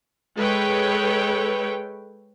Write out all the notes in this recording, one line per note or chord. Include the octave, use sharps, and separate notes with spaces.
G#3 A4 B4 C#5 G5